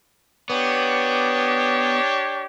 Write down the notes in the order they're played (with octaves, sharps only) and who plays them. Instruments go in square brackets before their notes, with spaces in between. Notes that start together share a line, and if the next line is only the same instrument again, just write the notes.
[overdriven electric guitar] B3 [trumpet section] D4 G4 C#5